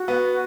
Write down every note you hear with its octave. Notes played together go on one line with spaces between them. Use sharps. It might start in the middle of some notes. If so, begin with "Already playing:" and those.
Already playing: F#4
B3